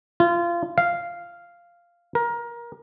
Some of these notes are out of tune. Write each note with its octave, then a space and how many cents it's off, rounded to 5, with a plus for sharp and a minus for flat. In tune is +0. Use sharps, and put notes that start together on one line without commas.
F4 -25
F5 -5
A#4 +20